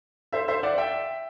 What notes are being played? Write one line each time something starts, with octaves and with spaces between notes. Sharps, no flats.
C5 E5
C5 E5
D5 F#5
E5 G5